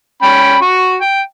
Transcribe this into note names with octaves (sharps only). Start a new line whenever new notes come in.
C#4 G5 B5
F#4 C#6
G5